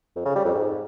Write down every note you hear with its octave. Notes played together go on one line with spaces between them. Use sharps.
F2
C#3
G3
F2
G#2